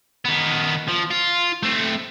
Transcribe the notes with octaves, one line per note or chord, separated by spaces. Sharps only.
D#3 B3
F3
F4
A3 C4